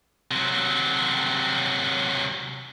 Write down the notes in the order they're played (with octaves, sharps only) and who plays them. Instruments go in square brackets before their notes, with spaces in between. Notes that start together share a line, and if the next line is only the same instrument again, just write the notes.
[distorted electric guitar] C3 F#3